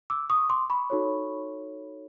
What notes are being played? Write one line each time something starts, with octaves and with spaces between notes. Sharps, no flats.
D6 E6
C#6 D#6
C6 D6
B5 C#6
D#4 F#4 A4 C#5